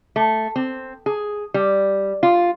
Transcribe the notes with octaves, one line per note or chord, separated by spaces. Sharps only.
A3
C4
G#4
G3
F4